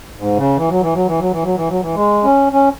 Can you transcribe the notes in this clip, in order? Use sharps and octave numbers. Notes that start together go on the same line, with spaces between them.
G#2
C#3
E3
F#3
E3
F#3
E3
F#3
E3
F#3
E3
F#3
E3
G#3
C#4
C#4